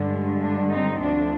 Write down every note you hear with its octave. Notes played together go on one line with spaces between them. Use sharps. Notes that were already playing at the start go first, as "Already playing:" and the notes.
Already playing: G2 D3 G#3 D4
D4
C4 D#4
D2 D3 F3 D4